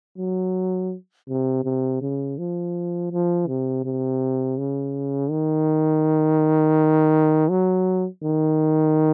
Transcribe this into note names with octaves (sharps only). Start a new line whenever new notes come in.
F#3
C3
C3
C#3
F3
F3
C3
C3
C#3
D#3
F#3
D#3